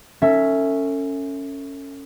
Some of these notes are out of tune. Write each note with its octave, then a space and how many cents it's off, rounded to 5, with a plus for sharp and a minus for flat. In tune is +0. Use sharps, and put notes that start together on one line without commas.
C#4 +0 A4 +35 E5 +0